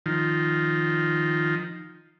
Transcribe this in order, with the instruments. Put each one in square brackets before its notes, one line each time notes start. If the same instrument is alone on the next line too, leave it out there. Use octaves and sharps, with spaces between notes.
[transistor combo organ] D#3 F3